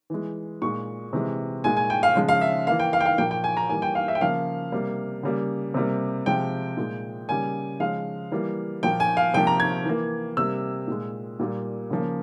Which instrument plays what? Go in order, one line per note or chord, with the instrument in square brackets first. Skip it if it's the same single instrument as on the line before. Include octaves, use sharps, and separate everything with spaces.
[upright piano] E3 G#3
A#2 G#3 C#6
C3 E3 G#3
A#2 G#3 G#5
G#5
G5
F5
C#3 F3 G#3
F5
E5
E3 A#3 F5
G5
F5
G5
F5
A#2 F3 A#3 G5
G5
G#5
A#5
E3 G3 A#3 G#5
G5
F5
E5
G5
C#3 F3 A#3 F5
C3 G3 A#3
C#3 G3 A#3
C3 G3 A#3
C3 F3 G#3 G5
A#2 G#3
C#3 G3 A#3 G#5
C#3 F3 G#3 F5
E3 G3 A#3
A#2 F3 A#3 G5
G#5
F5
C3 F3 A#3 G5
A#5
G#6
E3 A#3
C3 G3 A#3 E6
A#2 G#3
A#2 G3 A#3
C#3 F3 A#3